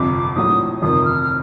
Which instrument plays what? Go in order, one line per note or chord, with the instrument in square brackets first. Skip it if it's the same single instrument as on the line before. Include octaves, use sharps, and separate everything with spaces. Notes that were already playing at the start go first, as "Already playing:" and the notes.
Already playing: [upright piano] G1 F2 C3 [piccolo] D6
[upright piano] A#1 A2 F#3 [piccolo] D#6
[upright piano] G1 F2 C3 D#3 [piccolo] D#6
[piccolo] F6
F6